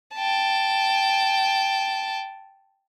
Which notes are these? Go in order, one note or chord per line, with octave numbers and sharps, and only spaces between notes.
G5 A5